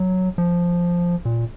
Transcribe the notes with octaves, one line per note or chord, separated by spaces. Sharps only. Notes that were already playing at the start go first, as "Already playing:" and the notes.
Already playing: F#3
F3
A#2